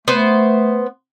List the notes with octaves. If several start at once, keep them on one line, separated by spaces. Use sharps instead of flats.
A3 B3 C5